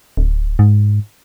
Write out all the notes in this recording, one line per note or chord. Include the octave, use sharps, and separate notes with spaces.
D1
G#2